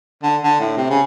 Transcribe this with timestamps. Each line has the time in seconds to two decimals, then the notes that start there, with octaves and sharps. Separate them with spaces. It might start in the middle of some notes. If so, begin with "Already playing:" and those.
0.23 D3
0.43 D3
0.60 A2
0.77 C3
0.90 C#3